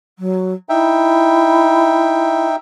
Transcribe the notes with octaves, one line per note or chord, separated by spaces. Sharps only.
F#3
D#4 E4 E5 G5